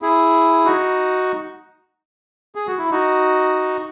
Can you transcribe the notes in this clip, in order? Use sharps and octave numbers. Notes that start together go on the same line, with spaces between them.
E4 G#4
D#4 F#4
G#4
F#4
E4
D#4 F#4